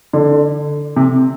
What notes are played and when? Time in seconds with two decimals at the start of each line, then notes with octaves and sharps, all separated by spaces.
0.13 D3
0.96 C3